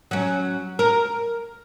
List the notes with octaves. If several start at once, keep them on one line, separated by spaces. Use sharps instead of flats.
F#3 C#4
A#4